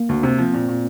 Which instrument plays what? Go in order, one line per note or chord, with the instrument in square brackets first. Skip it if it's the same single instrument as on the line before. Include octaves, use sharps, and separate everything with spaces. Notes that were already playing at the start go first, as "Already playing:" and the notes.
Already playing: [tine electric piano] A#3
[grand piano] D2
[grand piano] C3 [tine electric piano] C4
[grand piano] F3
A#2
A#2